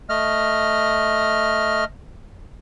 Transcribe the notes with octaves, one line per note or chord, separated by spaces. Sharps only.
A3 D#5 F6